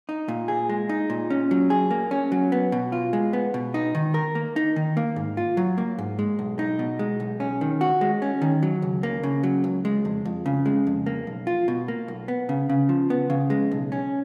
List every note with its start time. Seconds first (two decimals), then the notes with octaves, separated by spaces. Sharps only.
0.09 D#4
0.28 A#2
0.48 G#4
0.69 G#3
0.89 D#4
1.10 A#2
1.30 C#4
1.51 F#3
1.70 G#4
1.91 A#3
2.11 C#4
2.32 F#3
2.52 B3
2.72 B2
2.92 F4
3.13 G#3
3.33 B3
3.54 B2
3.74 D#4
3.95 D#3
4.14 A#4
4.35 A#3
4.56 D#4
4.76 D#3
4.97 A#3
5.16 G#2
5.37 F4
5.57 F#3
5.78 A#3
5.98 G#2
6.19 G#3
6.39 B1
6.59 D#4
6.79 B2
6.99 G#3
7.20 B1
7.40 C#4
7.61 D#3
7.81 F#4
8.01 G#3
8.22 C#4
8.42 D#3
8.63 F#3
8.82 C#2
9.03 A#3
9.23 C#3
9.43 F#3
9.64 C#2
9.85 G#3
10.05 F2
10.25 F2
10.46 C#3
10.66 G#3
10.87 F2
11.06 A#3
11.27 B1
11.47 F4
11.68 B2
11.88 A#3
12.08 B1
12.28 B3
12.49 C#3
12.69 C#3
12.89 F3
13.10 B3
13.30 C#3
13.50 G#3
13.71 B1
13.92 C#4